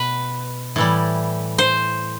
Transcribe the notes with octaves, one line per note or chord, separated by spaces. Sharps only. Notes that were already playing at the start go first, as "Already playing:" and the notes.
Already playing: B2 B4
A2 E3 G3
C5